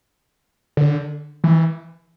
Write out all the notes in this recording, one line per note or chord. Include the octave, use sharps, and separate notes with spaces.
D3
E3